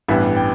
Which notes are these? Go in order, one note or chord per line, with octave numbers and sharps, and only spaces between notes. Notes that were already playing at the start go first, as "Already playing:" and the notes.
A1 G2 E3 G3 B3 E5
G5